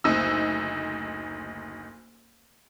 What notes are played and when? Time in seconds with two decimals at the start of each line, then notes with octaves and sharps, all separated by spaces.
0.04 F#1 D2 D#4 E6